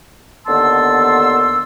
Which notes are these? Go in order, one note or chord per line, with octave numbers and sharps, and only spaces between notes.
D#2 D3 B3 A5 C6 E6